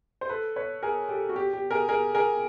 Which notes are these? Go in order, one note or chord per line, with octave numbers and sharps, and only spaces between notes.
C5
A4 B4
B4 C#5
G#4 A#4
G4 A4
F#4
G4
G4
G#4 A#4
G#4 A#4
G#4 A#4